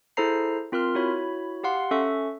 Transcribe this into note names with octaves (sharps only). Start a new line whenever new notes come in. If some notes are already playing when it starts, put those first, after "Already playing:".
E4 G#4 A4 C5 A#5 C7
C4 F4 A#4 C6 F6
E4 F#4 C#5 B5
G4 F5 F#5 C6
C#4 A4 E5 C#6